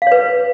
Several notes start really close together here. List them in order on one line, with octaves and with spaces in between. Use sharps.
F5 C#5 B4